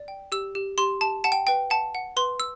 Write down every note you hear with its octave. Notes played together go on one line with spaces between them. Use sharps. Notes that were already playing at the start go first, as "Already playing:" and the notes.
Already playing: D5
G5
G4 E6
G4
G4 C6
G4 A5
F#5 A5
G5
B4 G5
F#5 A5
F#5
B4 C6
E6